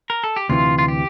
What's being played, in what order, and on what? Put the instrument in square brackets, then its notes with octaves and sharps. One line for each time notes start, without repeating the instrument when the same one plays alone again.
[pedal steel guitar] A#4
A4
G4
[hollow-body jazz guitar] D2 C3 E3 [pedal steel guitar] F4
[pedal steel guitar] F4
G4